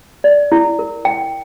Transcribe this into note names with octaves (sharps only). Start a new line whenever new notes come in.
D5
E4
A#4
G5